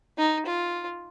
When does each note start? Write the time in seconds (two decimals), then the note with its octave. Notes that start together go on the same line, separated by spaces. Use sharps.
0.18 D#4
0.46 F4